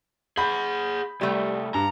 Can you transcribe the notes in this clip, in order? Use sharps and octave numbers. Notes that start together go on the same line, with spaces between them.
G#4 F#5 B5 G6
C2 G3 A3
G2 A#5